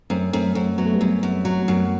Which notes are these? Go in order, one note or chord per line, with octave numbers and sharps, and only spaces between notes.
F#2 A3 C4
F#2 A3 C4
F#2 A3 C4
F#3 B3
A3
G3 B3
F#2
F#2
F#3
F#2